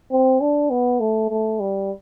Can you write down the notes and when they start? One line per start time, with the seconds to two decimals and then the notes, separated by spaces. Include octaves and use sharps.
0.12 C4
0.41 D4
0.70 B3
1.00 A3
1.30 A3
1.60 G3